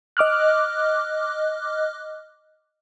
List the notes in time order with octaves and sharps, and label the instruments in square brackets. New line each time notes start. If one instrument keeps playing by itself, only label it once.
[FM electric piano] D#5 D6 F6 F#6